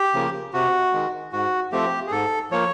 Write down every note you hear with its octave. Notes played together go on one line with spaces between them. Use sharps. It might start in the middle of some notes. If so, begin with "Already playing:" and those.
Already playing: G4
C#3 F3 A#3
C3 F#4
D#3 G#3
G#2 F#4
F3 A3 C4 G4
G#4
G#2 A4
F3 A#3 C#5